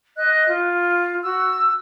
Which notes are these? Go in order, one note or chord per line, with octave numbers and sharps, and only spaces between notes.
D#5 F#6
F4
F#4 E6